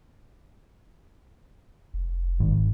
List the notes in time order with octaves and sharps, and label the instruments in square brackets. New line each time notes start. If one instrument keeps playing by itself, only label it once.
[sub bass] F1
[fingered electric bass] G#1